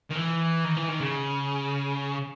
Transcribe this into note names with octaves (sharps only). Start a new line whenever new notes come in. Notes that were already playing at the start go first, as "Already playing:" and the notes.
D#3
E3
D#3
E3
D#3
C#3